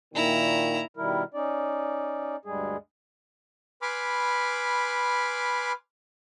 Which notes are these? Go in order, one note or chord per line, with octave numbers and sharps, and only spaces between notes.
A#2 D#3 E4 A#5
B2 D#3 G3 E4 A#4
C#4 D#4 D5
D2 G2 G3 G#3 G#4
B4 G#5 B5 C6 D6 F6